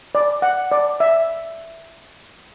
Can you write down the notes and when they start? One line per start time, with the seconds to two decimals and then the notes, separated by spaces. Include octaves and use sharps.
0.15 D5
0.42 F#5
0.72 D5
1.00 E5